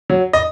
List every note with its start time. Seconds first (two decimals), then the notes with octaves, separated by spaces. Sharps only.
0.10 F#3
0.33 D#5